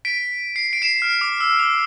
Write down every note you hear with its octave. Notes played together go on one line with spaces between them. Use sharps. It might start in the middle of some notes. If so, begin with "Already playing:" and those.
B6 D7
C7
D7
C7 E7
F6
D6
E6
D6